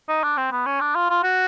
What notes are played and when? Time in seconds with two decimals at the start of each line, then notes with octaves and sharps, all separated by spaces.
0.09 D#4
0.24 D4
0.37 C4
0.52 B3
0.66 C#4
0.81 D4
0.95 F4
1.10 F4
1.23 F#4